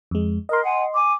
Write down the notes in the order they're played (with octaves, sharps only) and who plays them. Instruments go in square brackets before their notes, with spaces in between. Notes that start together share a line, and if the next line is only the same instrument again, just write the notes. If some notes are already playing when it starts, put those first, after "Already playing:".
[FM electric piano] F2 G#3
[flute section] A#4 [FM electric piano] D#5 C6
[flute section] F#5 G#5
G#5 D6